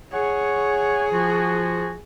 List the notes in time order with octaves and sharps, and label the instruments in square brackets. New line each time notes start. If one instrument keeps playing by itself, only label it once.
[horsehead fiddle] G#4 [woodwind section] C#5 F#5 C#6
[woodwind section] F3 F4 F#4